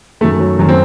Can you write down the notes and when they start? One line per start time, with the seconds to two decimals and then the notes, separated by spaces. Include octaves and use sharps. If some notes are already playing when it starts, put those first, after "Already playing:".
0.21 D#3 A3
0.24 F#2
0.39 F#3
0.59 F#2 D#3 F#3
0.69 C4